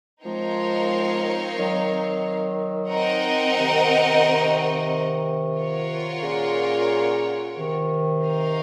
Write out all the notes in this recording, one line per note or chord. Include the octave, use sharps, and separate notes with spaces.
F3 G#3 C4 D#4 A#4 C#5 F5
D#3 F#3
C4 D#4 A#4 D#5 F#5
C3 D#3
F4 A#4 C#5 F#5
A#2 C#3
C3 D#3
D#4 A#4 F5